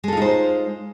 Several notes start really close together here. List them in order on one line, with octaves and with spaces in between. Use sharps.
G#3 A4 F4 D#4 C5